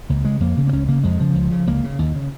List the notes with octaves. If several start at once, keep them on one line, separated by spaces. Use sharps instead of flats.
C#2 A#3
C#3 G#3
F2 A#3
C#3
A#3
C#2 C#4
C#3 A#3
F2 G#3
C#3 F3
C#2
C#3
C#2 A#3
C#3
D#2
C#3